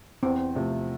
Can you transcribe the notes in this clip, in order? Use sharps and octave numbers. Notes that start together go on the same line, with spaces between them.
E2 C4
C3 F3 A3